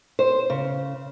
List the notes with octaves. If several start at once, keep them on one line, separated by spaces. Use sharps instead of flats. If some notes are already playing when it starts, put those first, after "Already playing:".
C5
C#3